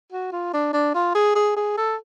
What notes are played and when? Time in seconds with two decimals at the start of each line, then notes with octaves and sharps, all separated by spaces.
0.12 F#4
0.32 F4
0.54 D4
0.73 D4
0.95 F4
1.15 G#4
1.35 G#4
1.56 G#4
1.77 A4